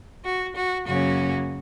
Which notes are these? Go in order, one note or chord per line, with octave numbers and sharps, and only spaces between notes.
F#4
F#4
F#2 C#3 F#3 A#3 C#4 F#4